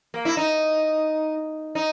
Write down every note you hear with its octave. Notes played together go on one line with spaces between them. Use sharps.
A#3
E4
D#4
D#4